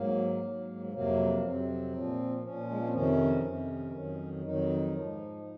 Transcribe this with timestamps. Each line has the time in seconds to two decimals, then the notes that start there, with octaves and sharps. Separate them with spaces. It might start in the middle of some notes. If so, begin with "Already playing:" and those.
Already playing: G#2 F#3 A#3
0.43 G#2 F#3
0.92 F2 C3 F#3 A#3
1.43 F2 C3 F#3 C4
1.93 A#2 F3
2.43 A#2 F3 C#4
2.70 G#3
2.78 A#3
2.86 C4
2.93 F2 C3 D#3 C#4
3.44 F2 C3 D#3
3.94 F2 D#3 F#3
4.44 F2 D#3 F#3 D#4
4.94 G#2 F3